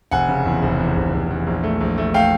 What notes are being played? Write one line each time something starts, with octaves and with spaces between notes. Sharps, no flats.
F1 F#5 G#5
C#3
E2
F1
E2
F1
F1
E2
A#1
A3
A#1
A3
A3 F5 G5